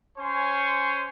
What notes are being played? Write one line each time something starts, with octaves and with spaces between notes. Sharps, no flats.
C#4 C5 C#5 G#5 C6 C#6